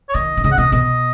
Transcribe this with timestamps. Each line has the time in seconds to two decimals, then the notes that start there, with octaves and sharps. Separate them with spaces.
0.09 C#5
0.14 D#3 D#5
0.37 D#3
0.44 C#3 D#5
0.52 F#5
0.58 B2 D#5
0.72 B2 D#5